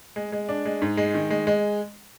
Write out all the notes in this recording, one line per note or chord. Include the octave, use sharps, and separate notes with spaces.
G#3
G#3
D4
G#3
G#2
G#3
D#3
G#3
G#3